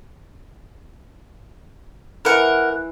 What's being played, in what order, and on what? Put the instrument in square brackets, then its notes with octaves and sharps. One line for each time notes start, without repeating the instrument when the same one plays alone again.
[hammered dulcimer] E3 [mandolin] A#4 F#5